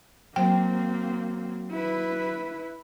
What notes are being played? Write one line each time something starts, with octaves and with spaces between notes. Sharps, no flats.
F#3 A#3 C4 C5 G5
E4 B4